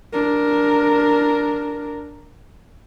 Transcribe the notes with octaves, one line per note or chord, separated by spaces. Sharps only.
D4 A#4